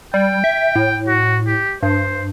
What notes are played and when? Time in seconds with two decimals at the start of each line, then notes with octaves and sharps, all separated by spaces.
0.14 G3 G5
0.44 E5
0.76 A2
1.07 F#4
1.47 G4
1.83 G2 C5